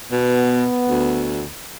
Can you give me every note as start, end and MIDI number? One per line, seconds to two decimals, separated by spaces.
0.12 0.64 47
0.12 1.50 59
0.88 1.46 38